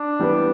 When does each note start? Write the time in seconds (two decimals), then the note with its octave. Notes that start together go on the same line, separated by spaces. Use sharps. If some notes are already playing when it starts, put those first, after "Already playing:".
Already playing: D4
0.19 E3 G3 B3